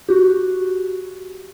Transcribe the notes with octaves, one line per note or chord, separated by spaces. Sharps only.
F#4 G4